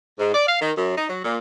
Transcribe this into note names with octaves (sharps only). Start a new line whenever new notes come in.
G#2
D5
F5
D#3
F#2
D#4
F#3
A#2